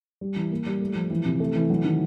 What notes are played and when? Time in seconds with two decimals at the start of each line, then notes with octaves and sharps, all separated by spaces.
0.21 G3
0.36 E3
0.51 A#3
0.66 G3
0.81 A3
0.95 F3
1.10 E3
1.25 C3
1.40 A3
1.55 E3
1.70 F#3
1.85 D#3